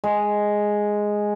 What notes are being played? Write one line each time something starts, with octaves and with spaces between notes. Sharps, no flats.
G#3